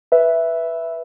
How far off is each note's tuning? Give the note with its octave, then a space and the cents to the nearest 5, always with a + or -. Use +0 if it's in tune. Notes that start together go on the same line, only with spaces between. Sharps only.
B4 -5 E5 +0